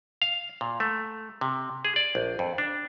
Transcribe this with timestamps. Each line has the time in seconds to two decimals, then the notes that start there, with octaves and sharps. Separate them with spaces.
0.22 F5
0.61 A#2
0.80 A3
1.41 C3
1.85 G#4
1.96 D5
2.15 A#1
2.39 F2
2.58 D4